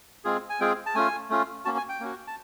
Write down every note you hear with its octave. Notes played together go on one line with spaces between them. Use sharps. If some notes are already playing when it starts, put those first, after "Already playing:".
G#3 C4 F4 G#4
G#5
G#3 C4 F4 G#4 G5
A5
A3 C#4 F4 G#5
A3 C#4 F4
A#3 C#4 F#4 A5
G#5
G5
A#3 C#4 F#4
A5